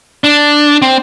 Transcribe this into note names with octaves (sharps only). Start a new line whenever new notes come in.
D4
C4